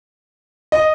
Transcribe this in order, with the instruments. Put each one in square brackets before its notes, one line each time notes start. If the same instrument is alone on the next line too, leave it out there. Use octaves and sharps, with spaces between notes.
[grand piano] D#5